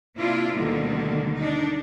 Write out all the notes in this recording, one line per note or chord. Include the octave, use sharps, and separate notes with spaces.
C3 A#3 D4 E4 F4
D2 B2 D3 D#3 G3 A#3
D4 D#4